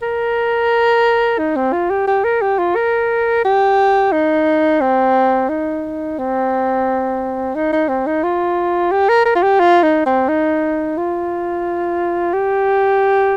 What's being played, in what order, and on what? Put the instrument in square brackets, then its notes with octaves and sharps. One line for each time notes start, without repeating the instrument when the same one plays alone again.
[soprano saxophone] A#4
D#4
C4
F4
G4
G4
A#4
G4
F4
A#4
G4
D#4
C4
D#4
C4
D#4
D#4
C4
D#4
F4
G4
A#4
A#4
F4
G4
F4
D#4
C4
D#4
F4
G4